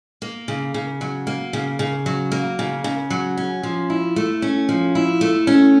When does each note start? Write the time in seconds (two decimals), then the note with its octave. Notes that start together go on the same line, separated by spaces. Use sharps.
0.22 A#3
0.48 C#3
0.74 C#3
1.01 F#3
1.27 A#3
1.53 C#3
1.79 C#3
2.06 F#3
2.32 A#3
2.59 C#3
2.84 C#3
3.10 F#3
3.37 C#4
3.63 F3
3.90 E4
4.16 A3
4.42 C#4
4.69 F3
4.95 E4
5.21 A3
5.47 C#4